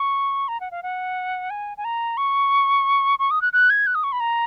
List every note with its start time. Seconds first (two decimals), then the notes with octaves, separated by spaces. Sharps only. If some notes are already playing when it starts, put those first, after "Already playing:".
Already playing: C#6
0.48 A#5
0.60 F#5
0.71 F5
0.83 F#5
1.50 G#5
1.77 G#5
1.85 A#5
2.17 C#6
3.19 C#6
3.31 D#6
3.42 F#6
3.53 F#6
3.70 G#6
3.87 F#6
3.95 D#6
4.04 C#6
4.12 B5
4.20 A#5